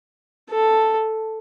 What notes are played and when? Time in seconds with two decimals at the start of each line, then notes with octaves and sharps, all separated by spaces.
0.51 A4